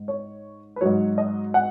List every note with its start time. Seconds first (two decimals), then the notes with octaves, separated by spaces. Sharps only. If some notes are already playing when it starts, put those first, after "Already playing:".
Already playing: G#2
0.08 C#5
0.76 B4
0.81 G#2 F#3 C#5
1.18 D#5
1.54 F#5